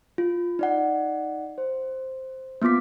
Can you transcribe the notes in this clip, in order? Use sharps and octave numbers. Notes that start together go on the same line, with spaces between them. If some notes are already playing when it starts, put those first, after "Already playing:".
F4
D#4 D5 F#5
C5
A#3 B3 F4 D6 B6